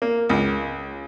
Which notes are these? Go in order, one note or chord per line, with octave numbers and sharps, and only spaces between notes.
A#3
C#2